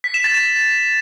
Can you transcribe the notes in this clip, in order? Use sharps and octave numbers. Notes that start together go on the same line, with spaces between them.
B6
E7
A6
E7